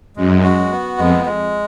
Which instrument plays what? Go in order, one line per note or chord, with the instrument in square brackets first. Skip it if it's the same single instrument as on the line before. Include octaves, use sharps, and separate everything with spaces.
[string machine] F#2 [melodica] G#3
[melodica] F#4
B3
[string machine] F2 [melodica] G#3
[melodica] G#3